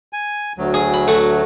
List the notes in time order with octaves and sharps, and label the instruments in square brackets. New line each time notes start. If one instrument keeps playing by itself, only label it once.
[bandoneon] G#5
D2 F#3
[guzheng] G#4
B5
A3 F#4